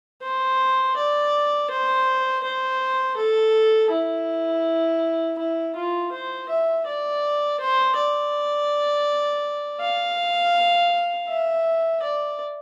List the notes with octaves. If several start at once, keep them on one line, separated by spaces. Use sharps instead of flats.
C5
D5
C5
C5
A4
E4
E4
F4
C5
E5
D5
C5
D5
F5
E5
D5